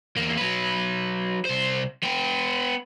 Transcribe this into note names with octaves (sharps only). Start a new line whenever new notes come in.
E2 A#3
F#3 B4
C2 C5
B3 G5